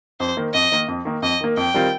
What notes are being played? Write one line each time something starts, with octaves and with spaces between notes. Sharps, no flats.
F2 C5
D#3 A#3
F2 D#5
D#3 A#3
F2
D#3 A#3
F2 D#5
D#3 A#3
F2 G5
D#3 G3 C4 F4